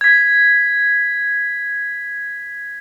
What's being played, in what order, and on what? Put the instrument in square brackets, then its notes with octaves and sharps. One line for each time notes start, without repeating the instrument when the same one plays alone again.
[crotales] G#6 B6